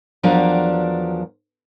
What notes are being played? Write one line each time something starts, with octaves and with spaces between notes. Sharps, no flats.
E2 F3 F#3 D4 A#4 D5